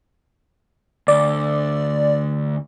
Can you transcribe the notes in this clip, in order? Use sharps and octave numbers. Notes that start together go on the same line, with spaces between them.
D2 D5